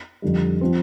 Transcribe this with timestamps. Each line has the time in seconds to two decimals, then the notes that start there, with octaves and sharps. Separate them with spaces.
0.22 F2 D3 G3
0.61 F3 C4